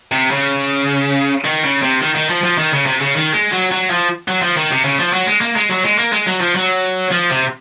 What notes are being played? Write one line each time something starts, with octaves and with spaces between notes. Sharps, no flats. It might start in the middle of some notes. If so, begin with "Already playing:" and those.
C3
C#3
D#3
C#3
C3
D#3
D#3
F3
F3
D#3
C#3
C3
C#3
D#3
G#3
F#3
F#3
F3
F#3
F3
D#3
C3
C#3
F3
F#3
G#3
A#3
G#3
F#3
G#3
A#3
G#3
F#3
F3
F#3
F3
C3